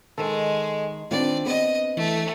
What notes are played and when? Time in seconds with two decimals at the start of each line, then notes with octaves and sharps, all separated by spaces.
0.18 D#3 G#3 A4
1.11 D#3 C4 D4 F4 B4 D5
1.46 B3 C4 B4 D#5
1.97 E3 A3